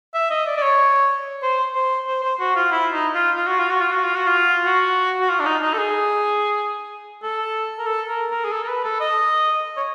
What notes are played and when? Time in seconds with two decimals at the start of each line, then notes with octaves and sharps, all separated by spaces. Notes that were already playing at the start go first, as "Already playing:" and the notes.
0.14 E5
0.30 D#5
0.46 D5
0.57 D5
0.62 C#5
1.43 C5
1.75 C5
2.07 C5
2.23 C5
2.40 F#4
2.56 F4
2.71 E4
2.93 D#4
3.15 F4
3.36 F4
3.47 F#4
3.59 F4
3.70 F#4
3.81 F4
3.93 F#4
4.04 F4
4.16 F#4
4.27 F4
4.65 F#4
5.20 F#4
5.29 F4
5.40 D4
5.45 D#4
5.62 D#4
5.74 A4
5.78 G#4
7.23 A4
7.78 A#4
7.87 A4
8.09 A#4
8.30 A#4
8.45 G#4
8.52 A4
8.64 A#4
8.68 B4
8.84 A4
9.00 D#5
9.77 C#5